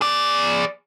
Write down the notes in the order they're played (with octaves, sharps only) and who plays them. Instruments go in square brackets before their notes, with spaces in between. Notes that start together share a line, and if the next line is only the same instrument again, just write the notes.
[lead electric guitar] G#4 D5